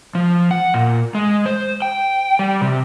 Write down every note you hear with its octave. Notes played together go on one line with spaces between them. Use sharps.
F3
F#5
A#2
G#3
C5
G5
G3
C3